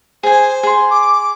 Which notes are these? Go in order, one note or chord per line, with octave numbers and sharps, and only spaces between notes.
G#4 C5 G#5
G#4 C6
D6